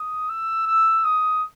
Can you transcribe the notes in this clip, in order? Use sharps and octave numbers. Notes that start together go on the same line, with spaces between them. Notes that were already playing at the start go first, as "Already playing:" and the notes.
Already playing: D#6
E6
E6
D#6